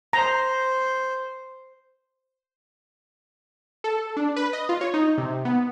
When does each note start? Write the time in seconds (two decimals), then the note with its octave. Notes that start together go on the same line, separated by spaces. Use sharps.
0.13 C5 A#5
3.84 A4
4.17 D4
4.36 B4
4.53 D#5
4.69 F4
4.81 C#5
4.94 D#4
5.18 C3
5.45 B3